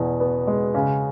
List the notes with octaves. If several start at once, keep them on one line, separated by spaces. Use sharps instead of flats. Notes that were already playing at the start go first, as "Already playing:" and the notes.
Already playing: E2 B2
B3
G#3
C#3